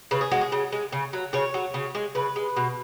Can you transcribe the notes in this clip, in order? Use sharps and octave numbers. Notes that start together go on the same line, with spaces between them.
C#3 B4
G#4
G#3 F#4
G#4
C#3
G#3
C#3
F#3
C#3 C#5
F#3
C#3
G#3
C#3 B4
G#3
B2